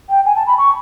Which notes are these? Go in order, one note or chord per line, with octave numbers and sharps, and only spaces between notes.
G5
G#5
A5
B5
C#6